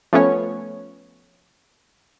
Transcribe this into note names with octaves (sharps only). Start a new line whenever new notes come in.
F3 A3 B3 C#4 C#5